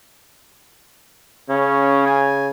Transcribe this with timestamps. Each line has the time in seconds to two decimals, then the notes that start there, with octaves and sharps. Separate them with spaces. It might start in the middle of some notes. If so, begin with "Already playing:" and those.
1.50 C#3 C#4
2.06 G#5